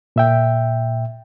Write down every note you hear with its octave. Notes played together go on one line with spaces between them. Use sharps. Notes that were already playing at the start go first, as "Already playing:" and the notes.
A#2 E5 G5